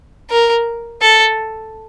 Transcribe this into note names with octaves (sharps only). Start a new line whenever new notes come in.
A#4
A4